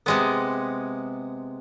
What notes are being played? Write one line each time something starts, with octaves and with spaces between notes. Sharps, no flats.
C3 G#3 B3